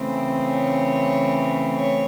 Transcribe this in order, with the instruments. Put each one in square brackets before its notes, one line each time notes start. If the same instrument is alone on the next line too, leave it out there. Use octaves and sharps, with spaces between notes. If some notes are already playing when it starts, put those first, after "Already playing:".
Already playing: [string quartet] C#3 E3 A3 C4
C#5
C#5